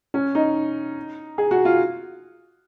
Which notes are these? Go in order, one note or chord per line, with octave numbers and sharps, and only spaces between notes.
C#4
D#4
G#4
F#4
F4